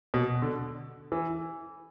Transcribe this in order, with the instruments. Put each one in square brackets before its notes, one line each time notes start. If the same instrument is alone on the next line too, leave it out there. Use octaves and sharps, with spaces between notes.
[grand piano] B2
D3
E3